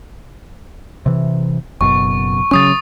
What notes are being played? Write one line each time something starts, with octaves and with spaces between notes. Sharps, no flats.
C3 E3
F#1 F#2 B2 C#6
C#3 F#3 C#4 C#6 D#6 A6